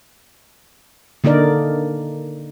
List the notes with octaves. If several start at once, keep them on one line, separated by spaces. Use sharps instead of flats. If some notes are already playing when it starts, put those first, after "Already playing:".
D3 A#3 D#4 A#4 D5